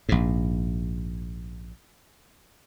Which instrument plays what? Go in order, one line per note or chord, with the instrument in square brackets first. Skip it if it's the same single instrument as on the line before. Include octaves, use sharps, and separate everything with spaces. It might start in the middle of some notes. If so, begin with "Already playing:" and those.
[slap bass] A#1 G#2